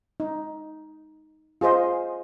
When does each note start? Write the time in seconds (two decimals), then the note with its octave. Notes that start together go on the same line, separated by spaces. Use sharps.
0.20 D#4
1.61 F4 G#4 C5 D#5